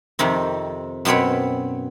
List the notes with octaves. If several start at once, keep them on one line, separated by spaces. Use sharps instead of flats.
F2 C3 D#3 C4
F#2 B2 C4 C#5 B5